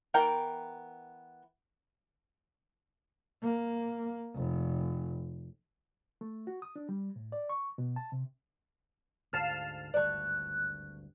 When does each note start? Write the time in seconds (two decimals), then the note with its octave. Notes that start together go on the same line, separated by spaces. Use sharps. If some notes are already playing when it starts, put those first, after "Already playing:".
0.14 E3 B3 A#4 G5
3.43 A#3
4.34 F1
6.21 A3
6.47 F#4
6.62 D#6
6.76 D4
6.89 G3
7.16 A2
7.32 D5
7.49 C#6
7.78 B2
7.96 A5
8.12 C3
9.33 D2 G#2 F5 A5 F6
9.94 G#1 D2 G2 A3 D5 F#6